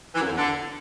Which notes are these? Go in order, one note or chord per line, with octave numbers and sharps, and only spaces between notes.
E3
F#2
F2
E2
D3